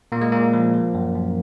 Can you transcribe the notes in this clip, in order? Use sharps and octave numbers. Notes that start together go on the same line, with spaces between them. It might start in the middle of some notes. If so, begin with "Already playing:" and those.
A#2 A#3
G#3
A#2 A#3
F3
F3
F#2
F#2